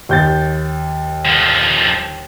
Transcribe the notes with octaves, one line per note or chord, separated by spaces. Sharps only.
D#2 G6 A6
D3 F3